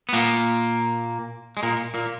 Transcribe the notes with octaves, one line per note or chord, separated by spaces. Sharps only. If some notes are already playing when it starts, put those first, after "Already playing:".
B3
A#2 A#3
G#3
A#2 A#3
A#2 A#3